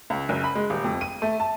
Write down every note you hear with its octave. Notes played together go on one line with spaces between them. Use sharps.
C#2
F#1
B5
G#3
D#1
F2
D#7
A3
A5